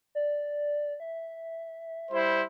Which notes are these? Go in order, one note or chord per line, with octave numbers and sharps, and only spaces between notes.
D5
E5
G3 E4 C5